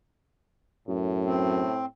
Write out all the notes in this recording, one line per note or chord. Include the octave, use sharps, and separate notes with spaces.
F#2 A2
C4